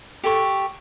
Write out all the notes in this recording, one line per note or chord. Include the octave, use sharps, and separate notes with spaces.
G4 A4 C#6